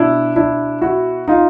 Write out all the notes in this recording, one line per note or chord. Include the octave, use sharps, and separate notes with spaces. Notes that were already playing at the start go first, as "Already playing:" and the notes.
Already playing: B2 D4 E4
D4 E4
E4 F#4
D#4 F4